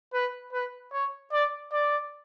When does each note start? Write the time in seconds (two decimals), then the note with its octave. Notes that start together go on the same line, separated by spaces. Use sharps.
0.14 B4
0.53 B4
0.93 C#5
1.32 D5
1.72 D5